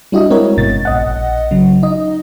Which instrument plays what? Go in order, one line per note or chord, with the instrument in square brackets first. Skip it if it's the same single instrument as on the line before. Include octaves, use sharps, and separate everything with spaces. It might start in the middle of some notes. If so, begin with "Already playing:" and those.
[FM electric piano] G3 D4 E4 F#4 D#5
G#3 C4 F#4 A#4 C#5
G1 B2 A6
A#1 D#5 F#5
C#3 F#3
D#4 D#5